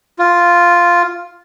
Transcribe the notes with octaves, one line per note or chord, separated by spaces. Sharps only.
F4